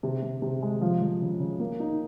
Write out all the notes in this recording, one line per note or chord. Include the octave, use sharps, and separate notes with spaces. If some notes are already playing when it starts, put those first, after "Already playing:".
C3
C3
C3
G#3
F3
F3
C#3
C#3
A#3
D#4